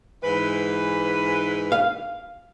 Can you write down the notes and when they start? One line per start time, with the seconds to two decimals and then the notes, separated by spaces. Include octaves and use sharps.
0.23 G#2 E3 B4
1.72 F5